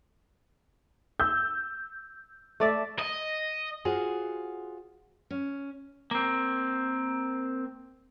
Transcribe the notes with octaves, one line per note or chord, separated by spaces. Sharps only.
E6 G6
A3 D5 E5
D#5
F4 F#4 G#4 C5 F#5
C#4
A#3 C4